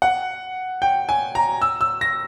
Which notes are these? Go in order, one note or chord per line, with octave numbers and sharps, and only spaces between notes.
F#5
G5
G#5
A#5
E6
E6
A#6